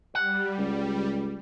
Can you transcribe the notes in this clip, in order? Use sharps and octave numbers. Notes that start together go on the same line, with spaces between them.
G3 F#5
C#2